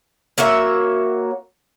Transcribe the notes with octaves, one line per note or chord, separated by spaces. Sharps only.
A#3 F#4 C#5 E5